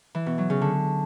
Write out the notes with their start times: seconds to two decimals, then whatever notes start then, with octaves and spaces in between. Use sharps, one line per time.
0.15 E3
0.26 B2
0.38 F#3
0.50 C#3
0.61 D3